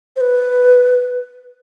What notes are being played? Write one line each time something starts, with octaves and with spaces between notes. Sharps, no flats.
C5
B4